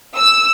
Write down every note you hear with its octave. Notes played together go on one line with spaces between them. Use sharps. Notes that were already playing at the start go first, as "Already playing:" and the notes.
E6